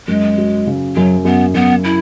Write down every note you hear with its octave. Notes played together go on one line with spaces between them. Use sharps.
F#2 G#3
F#3
C#3
F#2 F#3
F#2 B3
F#2 B3
E4